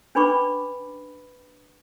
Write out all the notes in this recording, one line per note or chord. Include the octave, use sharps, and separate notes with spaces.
C#4 D4 B4 B5 C#6 D6